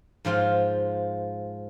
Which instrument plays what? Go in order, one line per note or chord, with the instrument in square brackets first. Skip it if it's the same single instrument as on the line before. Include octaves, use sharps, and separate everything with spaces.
[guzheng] G#2 F3 F4 G5